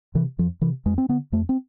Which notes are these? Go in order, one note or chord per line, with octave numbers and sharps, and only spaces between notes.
C3 E3
F2 F3
C3 E3
F2 G#3
C4
D3 B3
F2 A3
C4